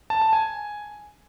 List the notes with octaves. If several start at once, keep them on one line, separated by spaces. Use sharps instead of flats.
A5
A5
G#5